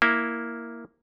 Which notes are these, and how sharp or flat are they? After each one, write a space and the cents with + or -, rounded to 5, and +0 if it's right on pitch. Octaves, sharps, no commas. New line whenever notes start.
A#3 +0 E4 +0